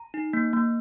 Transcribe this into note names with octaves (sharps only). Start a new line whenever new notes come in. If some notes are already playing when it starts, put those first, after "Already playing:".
Already playing: A#5
D#4
A#3
A#3